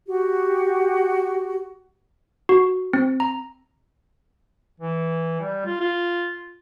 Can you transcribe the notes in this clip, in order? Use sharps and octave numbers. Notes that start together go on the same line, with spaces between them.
F#4 G4
F#4
C4
A#5
E3
G3
F4
F4